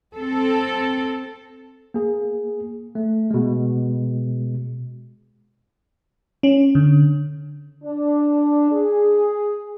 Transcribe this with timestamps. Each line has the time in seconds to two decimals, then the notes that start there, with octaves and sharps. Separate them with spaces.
0.15 C4 A4
1.94 A#3 G#4
2.95 A3
3.31 B2 G#3
6.43 C#4
6.75 D3
7.84 D4
8.71 G#4